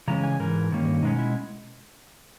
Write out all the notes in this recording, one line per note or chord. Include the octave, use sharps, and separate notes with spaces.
C#3 E3 G#3 C#4 A#5
G#5
G#2 E3 A#4
G2 D#3 A#3 C#4
B2 G#3 C#4 D#4
E4